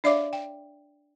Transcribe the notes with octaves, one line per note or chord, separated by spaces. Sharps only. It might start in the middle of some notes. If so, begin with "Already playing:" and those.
D4 C#5 D5 E5 F5 D6
G5